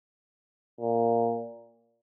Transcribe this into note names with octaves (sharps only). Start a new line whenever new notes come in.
A#2